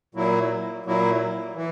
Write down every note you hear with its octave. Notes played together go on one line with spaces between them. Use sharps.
A#2 F#3 A#3 E4
A#2 F#3 A#3 E4
E3